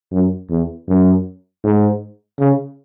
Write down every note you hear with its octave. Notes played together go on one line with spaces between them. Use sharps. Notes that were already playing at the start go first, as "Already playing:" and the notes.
F#2
E2
F#2
G#2
C#3